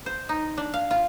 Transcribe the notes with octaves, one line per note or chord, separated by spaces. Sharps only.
C5
D#4
D4
F5
F4